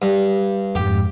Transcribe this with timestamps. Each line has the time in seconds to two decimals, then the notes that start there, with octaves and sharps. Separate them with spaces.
0.02 G2
0.75 F2 G#2 G4